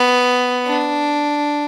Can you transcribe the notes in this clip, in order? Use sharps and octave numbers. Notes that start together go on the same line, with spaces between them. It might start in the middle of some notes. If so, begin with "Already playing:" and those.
Already playing: B3
D4